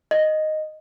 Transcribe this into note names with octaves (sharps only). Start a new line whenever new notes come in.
D#5